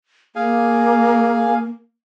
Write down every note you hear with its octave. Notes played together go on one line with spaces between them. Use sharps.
A#3 G#4 F5 G#5